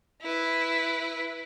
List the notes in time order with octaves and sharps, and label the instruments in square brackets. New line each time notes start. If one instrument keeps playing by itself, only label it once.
[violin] E4 B4